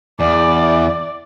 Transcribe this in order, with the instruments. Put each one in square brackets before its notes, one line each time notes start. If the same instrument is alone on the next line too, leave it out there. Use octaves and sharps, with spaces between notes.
[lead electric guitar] E2 [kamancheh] D5